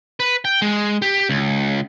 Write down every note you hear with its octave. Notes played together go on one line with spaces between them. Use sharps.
B4
G5
G#3
G4
C#2